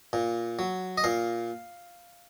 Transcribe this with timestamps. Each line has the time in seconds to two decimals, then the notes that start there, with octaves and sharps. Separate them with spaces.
0.13 A#2
0.59 F#3
0.98 D#5
1.04 A#2 F5